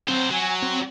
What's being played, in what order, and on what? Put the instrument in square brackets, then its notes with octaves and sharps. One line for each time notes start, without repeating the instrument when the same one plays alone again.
[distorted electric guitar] F#3 C5 [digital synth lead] C4
[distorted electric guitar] F#3 [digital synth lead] G#5
[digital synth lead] C4